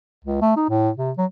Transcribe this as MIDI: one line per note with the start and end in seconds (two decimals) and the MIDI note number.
0.24 0.42 37
0.42 0.52 57
0.56 0.64 63
0.69 0.89 45
0.97 1.11 48
1.18 1.25 54